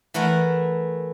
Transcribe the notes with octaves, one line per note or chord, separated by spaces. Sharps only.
E3 A3 E4 A#4 F#5